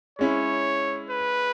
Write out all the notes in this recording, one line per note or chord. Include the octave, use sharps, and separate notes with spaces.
G#3 C#4 E4 C#5
B4